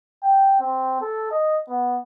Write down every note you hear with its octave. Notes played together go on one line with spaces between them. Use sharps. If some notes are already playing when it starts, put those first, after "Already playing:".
G5
C4
A4
D#5
B3